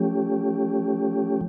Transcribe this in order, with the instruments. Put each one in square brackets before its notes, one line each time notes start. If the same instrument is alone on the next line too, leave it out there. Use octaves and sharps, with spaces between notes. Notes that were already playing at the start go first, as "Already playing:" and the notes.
Already playing: [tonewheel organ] F3 A3 C#4 G4